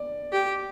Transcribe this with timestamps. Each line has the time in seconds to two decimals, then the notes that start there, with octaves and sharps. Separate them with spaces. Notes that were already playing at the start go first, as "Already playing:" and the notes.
Already playing: D5
0.32 G4